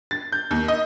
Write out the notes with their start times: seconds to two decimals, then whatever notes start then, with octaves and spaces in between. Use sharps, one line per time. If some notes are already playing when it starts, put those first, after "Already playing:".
0.11 A6
0.32 G6
0.51 D#2
0.68 D#5